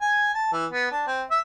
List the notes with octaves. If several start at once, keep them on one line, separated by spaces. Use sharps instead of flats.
G#5
A5
E3
B3
D4
C4
E5